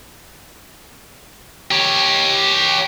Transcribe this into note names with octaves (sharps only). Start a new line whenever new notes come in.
G4 C#5